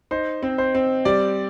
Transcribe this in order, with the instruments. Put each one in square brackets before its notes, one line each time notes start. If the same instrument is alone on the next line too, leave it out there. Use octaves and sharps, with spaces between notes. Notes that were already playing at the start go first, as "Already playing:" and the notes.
[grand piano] D#4 C5
C4
C5
C4
G3 D5